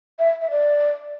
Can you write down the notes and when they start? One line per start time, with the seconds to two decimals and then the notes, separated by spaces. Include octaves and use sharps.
0.19 E5
0.41 E5
0.51 D5